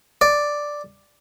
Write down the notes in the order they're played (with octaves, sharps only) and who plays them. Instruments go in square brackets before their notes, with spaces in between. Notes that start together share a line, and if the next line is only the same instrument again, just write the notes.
[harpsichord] D5